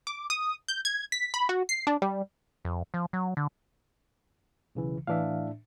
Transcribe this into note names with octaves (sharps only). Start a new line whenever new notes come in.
D6
D#6
G6
G#6
B6
B5
F#4
C7
D4
G3
F2
F3
F#3
D3
B1 C#3 E3
A2 E3 D4 E5 F5